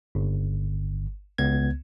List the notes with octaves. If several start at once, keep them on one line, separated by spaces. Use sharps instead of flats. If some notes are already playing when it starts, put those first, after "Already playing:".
G1
C#2 B3 G#6